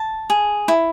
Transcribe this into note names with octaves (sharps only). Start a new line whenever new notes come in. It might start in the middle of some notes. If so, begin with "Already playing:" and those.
Already playing: A5
G#4
E4